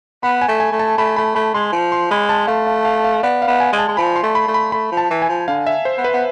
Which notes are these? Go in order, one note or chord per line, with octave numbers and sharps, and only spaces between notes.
B3 B5
G#5
A3
G#5
A3
A5
A3 B5
A3 B5
A3 B5
G#3 C6
F3
C6
G#3 B5
A5
A3 F5
F5
F5
F5
B3 D5
F5
B3
G#5
G#3
A5
G#3
F3 B5
C6
A3
B5
A3
B5
A3 B5
F3
A5
E3
G#5
F3
D3 F5
E5
C5
B3
B4
B3